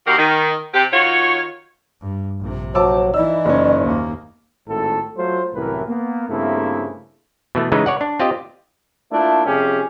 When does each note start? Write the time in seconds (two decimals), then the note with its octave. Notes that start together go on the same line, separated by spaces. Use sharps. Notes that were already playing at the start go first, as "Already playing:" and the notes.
0.07 D#2 D#3 A#3 F#4 G4 A#4
0.19 D#3
0.74 C3 G4
0.93 D#3 F4 F#4 C#5
2.01 G2
2.40 A#1 C3
2.75 F#3 C5 A5 D6 E6
3.14 E3 D#4 E4 D5 E6
3.45 F#1 C#4
3.82 D#2 A#3
4.68 G#1 A2 A3 A4
5.17 F#3 A3 F4 C5
5.54 C2 F#2 A2 E3 A#4 B4
5.87 A#3 B3
6.29 G2 C#3 A3 A#3 C4 E4
7.55 B2 E3 A3
7.72 C#3 E3 G#3 D#4 B4
7.86 C#5 D5 F#5
8.01 D4
8.19 C4 F4 G4 D#5
9.11 A3 A#3 D4 E4 F4
9.46 F2 C3 C#4 G4 G#4